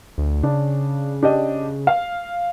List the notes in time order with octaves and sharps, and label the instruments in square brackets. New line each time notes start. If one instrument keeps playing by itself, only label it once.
[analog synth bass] D2
[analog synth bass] C#3 [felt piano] D4
[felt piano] D4 G4 D#5
F5